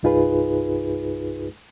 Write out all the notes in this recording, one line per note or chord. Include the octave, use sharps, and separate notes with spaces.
C2 G2 D#4 F4 G#4 B4